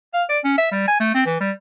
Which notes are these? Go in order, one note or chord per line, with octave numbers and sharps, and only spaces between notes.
F5
D5
C#4
E5
G3
G#5
A3
C4
E3
G3